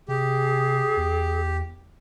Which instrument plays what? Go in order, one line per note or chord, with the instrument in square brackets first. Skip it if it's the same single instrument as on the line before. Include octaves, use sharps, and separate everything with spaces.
[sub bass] C3 [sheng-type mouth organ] G4 [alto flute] G#4
[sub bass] E2